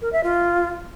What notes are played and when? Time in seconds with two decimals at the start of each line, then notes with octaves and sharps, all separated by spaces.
0.02 A#4
0.13 E5
0.24 F4